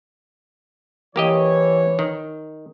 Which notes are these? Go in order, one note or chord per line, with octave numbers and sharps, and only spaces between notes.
E3 A#3 G4 C#5 D#5
D#3